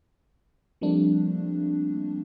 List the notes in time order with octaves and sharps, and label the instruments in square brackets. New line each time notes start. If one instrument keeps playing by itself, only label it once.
[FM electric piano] F3 G3 A3 A#3 C4 D4